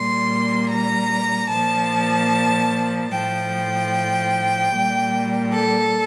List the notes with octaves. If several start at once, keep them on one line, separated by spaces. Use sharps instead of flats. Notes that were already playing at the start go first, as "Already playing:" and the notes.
Already playing: A#2 G3 C6
A#5
A#2 F3 A5
A2 F3 G5
A#2 G3
A4